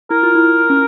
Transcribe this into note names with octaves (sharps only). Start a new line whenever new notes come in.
E4 A#4
F4
E4
C#4